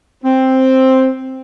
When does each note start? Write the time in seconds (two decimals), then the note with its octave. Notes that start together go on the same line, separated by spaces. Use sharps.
0.24 C4